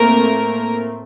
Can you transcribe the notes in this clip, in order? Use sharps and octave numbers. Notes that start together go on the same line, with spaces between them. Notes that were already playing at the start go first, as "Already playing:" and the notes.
Already playing: A2 A3 A#3 C4 A#4